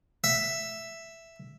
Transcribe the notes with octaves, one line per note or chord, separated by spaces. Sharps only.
E5